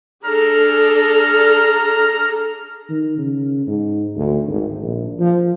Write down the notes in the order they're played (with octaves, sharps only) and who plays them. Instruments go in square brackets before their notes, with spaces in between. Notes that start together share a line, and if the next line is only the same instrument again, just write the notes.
[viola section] D4 G#4 A4 [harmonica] A#5 F6
[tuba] D#3
C#3
G#2
D2
G#1
A#1
F3